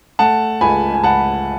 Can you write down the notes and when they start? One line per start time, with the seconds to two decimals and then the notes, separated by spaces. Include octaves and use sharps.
0.19 A3 F#5 A5
0.61 C#2 G#5 B5
0.94 G#5
1.04 C#2 F#5 A5